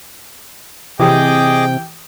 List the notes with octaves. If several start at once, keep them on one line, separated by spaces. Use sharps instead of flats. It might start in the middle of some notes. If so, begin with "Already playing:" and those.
C3 E3 G4 G#4 D#5 G5 D6 D#6